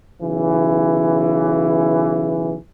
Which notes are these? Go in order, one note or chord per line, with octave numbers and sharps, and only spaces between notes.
B1 C#3 E3